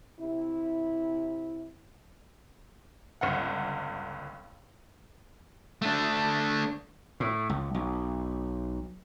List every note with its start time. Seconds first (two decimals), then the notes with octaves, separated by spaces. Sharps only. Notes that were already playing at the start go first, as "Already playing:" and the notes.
0.20 C3 E4
3.21 G1 C#2 F#5
5.82 A3 D4
7.20 A2
7.49 C#2
7.74 B1